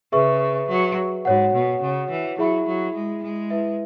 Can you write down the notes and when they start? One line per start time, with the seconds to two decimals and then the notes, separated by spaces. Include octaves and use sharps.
0.12 C#3 G#4 B4 E5 C#6
0.68 F#3
1.25 G#2 F#4 C#5 F#5
1.53 B2
1.81 C#3
2.10 E3
2.38 F#3 E4 G#4 E5 B5
2.67 F#3
2.94 G#3
3.22 G#3
3.50 E4 B4 E5